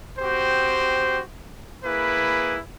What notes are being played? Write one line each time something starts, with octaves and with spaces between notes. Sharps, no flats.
C4 F#4 G4 C5
A#3 E4 G#4 B4